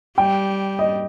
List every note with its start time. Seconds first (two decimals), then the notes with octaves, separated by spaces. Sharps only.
0.18 G3 G5
0.79 D#5